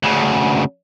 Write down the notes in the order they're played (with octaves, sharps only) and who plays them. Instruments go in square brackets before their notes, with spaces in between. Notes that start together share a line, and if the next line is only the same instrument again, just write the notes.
[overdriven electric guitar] D2 C#3